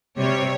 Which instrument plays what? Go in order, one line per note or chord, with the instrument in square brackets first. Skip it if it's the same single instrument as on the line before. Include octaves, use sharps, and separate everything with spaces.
[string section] C3 G3 C#5